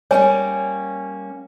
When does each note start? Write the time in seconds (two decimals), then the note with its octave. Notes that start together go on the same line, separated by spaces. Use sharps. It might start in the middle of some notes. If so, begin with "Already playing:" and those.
0.11 G3 A#3 C#4 C#5 G#5